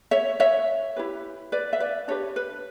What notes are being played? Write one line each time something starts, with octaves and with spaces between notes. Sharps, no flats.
C#5 E5
C#5 E5
E4 G4 B4
B4 D5
E5
B4 D5
D4 G4 B4 C#5
B4